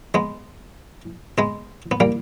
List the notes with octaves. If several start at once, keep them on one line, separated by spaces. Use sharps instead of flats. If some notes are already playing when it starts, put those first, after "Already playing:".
G#3 B3
G#3 B3
B3
G3 A#3